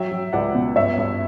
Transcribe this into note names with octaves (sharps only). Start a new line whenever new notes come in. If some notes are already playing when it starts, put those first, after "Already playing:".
Already playing: F#3 E5 G5
F#3
C#2 D5 F#5
B2
G2 C#5 E5
G2